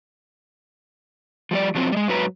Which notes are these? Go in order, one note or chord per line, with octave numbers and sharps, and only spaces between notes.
F3 G3 D5
B2 F3 F#3 A#3 C4
G3 G#3
G#2 F#3 B4 A#5